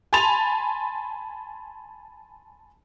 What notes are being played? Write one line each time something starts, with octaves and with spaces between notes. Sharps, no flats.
G#5 A5 B5 C6 A6 F7